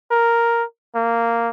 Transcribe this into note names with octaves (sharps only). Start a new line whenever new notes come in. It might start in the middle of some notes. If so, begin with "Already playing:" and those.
A#4
A#3